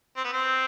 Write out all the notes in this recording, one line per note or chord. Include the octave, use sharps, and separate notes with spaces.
C4
B3
C4